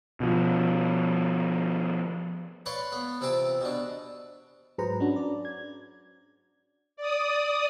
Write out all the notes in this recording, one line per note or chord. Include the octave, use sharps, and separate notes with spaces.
B2 F3
B4 C#5 D5 F5 C6
B3
C3 E3 C4 F4 D6
B2 D4
G#2 F#3 G#4 B4 C5 A#5
C#4 D4 F#4
D5
G#6
D5 D#6